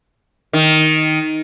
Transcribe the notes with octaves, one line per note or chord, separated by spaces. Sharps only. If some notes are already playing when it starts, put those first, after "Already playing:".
D#3